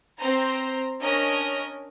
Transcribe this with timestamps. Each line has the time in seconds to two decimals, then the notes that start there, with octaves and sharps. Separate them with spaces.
0.17 C4 C5 A#5
1.00 C#4 D4 A#4 D#5